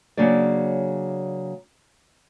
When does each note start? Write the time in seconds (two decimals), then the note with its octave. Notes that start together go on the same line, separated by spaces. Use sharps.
0.17 C#3 F#3 A#3 D4 D5